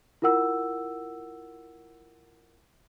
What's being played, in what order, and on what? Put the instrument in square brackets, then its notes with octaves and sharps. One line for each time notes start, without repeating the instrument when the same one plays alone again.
[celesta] E4 F4 A#4 F#5 E6